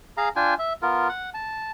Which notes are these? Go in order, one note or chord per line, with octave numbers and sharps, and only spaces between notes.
G#4 F5 A#5
D4 F4 G5 G#5
E5
B3 F4 A#4
F#5
A5